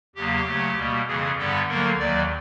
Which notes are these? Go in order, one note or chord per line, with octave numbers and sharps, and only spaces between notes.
E2 C#3 F#3 A#3 G4
D2 C#3 F#3 A3
B2 G3 A#3
F2 C#3 E3 G#4
G2 D3 G3 B3 A4
D2 D3 F#3 A#3 A#4
D#2 D#3 F#3 D5